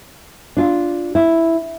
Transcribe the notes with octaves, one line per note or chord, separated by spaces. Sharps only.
D4 F4
E4